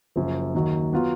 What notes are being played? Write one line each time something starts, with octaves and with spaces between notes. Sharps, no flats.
F#1 F#2 F3
D#2 D#3 F#3
F#3 B3 F4